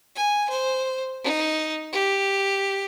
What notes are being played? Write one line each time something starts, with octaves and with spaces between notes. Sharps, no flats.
G#5
C5
D#4
G4